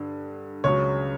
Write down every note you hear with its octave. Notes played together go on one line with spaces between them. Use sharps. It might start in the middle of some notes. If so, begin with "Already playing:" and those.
Already playing: G2 D3
C#2 C#3 F#3 C#5